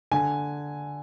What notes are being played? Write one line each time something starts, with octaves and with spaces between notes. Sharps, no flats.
D3 G#5